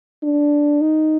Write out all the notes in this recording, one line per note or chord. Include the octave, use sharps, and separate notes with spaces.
D4
D#4